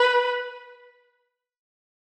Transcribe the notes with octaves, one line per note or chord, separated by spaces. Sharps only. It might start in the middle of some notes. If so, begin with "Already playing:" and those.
Already playing: B4